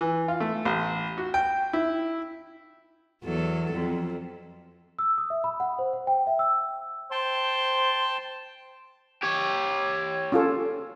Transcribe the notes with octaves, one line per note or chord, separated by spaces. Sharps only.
E3
F4
A3
A1
F#4
G5
E4
E2 F#3 A4
F2
E6
D#6
E5
B5
F#5
C5
F#5
G5
E5
E6
C5 G5 A5 C6
G4 C#5
C#4 F4 A4